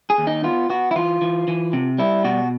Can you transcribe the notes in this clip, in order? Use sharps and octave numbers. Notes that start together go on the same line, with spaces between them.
G#4
D#2
D#4
B3 F4
B3 F#4
E4
E3 F4
E3
E3
C3
G3 E4
B2 F#4